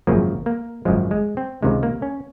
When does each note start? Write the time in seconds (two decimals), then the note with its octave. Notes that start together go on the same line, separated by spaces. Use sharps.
0.07 G#1 F#2 C#3 F3 A#3
0.46 A#3
0.85 G#1 F#2 C#3 F3 G#3
1.11 G#3
1.37 C4
1.62 C#2 C3 D#3 G#3
1.83 A#3
2.02 C#4